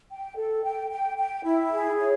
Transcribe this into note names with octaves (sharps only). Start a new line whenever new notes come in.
G5
A4
G5
G5
G5
E4
G#4
C#5